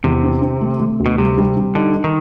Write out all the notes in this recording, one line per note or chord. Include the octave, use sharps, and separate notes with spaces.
E2 C3
C4
C4
A3
A3
D2
B2
C3 G3
G3
G3
D3 D#4
D#4
D#3